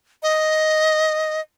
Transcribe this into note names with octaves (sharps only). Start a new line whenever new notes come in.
D#5